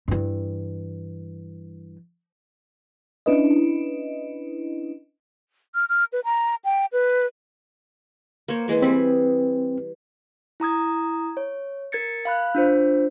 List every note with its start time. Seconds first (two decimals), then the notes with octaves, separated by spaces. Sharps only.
0.08 G2 E3
3.26 C#4 D4 E4 B4 D#5
5.75 F6
5.89 F6
6.13 B4
6.24 A#5
6.65 G5
6.93 B4
8.48 A#3 C5 C#5
8.68 E3 G#3 A#3
8.82 G3 C4 G#4 B5
10.60 E4 A#5 D#6 G#6
11.37 C#5
11.92 A#4 G#6 A6 C#7
12.25 F5 B5 F#6
12.55 D4 F4 C5